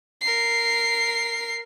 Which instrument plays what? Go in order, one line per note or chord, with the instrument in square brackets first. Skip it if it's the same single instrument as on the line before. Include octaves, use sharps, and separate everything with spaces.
[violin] A#4 C7